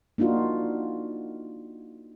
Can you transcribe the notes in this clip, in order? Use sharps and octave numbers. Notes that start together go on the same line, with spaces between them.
A#3 D4 D#4 F4 F#4